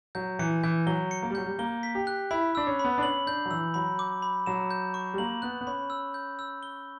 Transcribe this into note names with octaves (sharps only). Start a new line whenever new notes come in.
F#3 G6
E3 C#7
E3 G6
F#3 G7
C#7
A#3
G3
F#3 G6
G3
A#3 G7
B6
G4
F#6
E4 B5
D4 E6
C#4
B5
B3
D4
C#4 F#7
D4 G6
F#3
E3 E6
F#3 B5
D6
B5
F#3 E7
G6
C#6
G3
A#3 F#7
B3 F#6
B3
C#4 B5
E6
G6
E6
G7